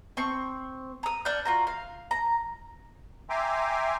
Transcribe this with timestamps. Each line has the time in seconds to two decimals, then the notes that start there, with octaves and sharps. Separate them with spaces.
0.17 C4 C#6
1.03 A#5 D#6
1.25 D4 F#5 F6 G6
1.45 F4 F#4 A#5
1.67 F5
2.11 A#5
3.30 E5 G5 G#5 A#5 C6 D6